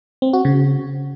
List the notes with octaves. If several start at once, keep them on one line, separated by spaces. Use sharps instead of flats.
C4
F#4
C#3